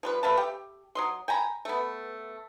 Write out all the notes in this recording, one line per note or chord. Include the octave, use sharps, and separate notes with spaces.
F3 G3 B4
A3 B4 F5 A5
G4 G5
F#3 D#5 C6
G5 G#5 A#5 B5
A3 B3